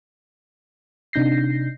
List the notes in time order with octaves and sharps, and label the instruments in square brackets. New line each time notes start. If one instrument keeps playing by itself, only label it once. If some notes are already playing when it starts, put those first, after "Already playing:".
[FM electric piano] C3 D4 D#4 G6 A#6 C7